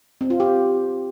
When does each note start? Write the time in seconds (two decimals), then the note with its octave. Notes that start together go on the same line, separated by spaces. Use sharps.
0.21 C4
0.30 F4
0.40 G4